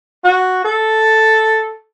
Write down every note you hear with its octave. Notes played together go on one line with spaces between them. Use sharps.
F#4
A4